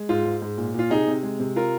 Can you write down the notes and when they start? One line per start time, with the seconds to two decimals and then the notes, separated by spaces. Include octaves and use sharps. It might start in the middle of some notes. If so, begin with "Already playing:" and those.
Already playing: G#3
0.09 G#2 F4
0.25 G#2
0.42 G#2
0.58 A#2
0.74 A#2 F4
0.90 C3 D#4 G#4
1.07 C3
1.23 G#3
1.40 C3
1.56 F4 A#4